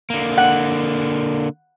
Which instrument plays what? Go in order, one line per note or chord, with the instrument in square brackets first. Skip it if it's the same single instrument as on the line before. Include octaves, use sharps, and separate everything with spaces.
[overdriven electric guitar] D3 A#3
[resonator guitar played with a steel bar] F#5